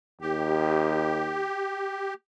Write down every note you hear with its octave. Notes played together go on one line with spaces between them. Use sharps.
D#2 G4